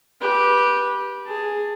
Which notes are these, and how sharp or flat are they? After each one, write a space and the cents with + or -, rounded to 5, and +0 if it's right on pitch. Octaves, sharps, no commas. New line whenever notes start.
G4 +0 B4 -20
G#4 +0 A5 +15